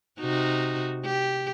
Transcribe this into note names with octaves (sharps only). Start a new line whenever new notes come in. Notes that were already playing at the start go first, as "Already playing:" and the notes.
C3 D#4 F#4
G4